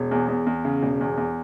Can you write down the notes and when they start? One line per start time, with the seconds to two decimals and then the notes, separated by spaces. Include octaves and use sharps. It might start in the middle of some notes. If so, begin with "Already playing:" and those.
Already playing: E1
0.11 E2
0.28 E2
0.47 E2
0.65 C#3
0.83 E1
1.01 E2
1.17 E2